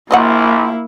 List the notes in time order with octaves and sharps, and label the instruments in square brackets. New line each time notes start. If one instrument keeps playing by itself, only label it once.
[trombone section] A#1 [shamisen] F#3 D#5 F#5 [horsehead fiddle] A#3 E4